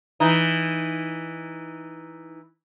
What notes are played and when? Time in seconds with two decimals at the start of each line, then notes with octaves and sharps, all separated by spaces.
0.20 E3 D#4